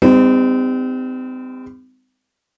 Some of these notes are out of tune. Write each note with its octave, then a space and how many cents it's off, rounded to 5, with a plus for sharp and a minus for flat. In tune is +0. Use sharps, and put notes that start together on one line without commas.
G3 +35 C4 -35 D#4 +0